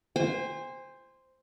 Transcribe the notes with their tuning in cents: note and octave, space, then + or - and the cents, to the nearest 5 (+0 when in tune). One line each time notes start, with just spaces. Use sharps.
C5 +0 G#5 -40